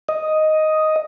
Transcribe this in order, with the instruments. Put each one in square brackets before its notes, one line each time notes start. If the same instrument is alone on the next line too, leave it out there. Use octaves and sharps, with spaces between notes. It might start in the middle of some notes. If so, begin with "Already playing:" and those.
[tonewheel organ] D#5